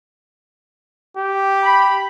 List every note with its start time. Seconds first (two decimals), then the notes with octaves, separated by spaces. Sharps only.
1.17 G4
1.63 B5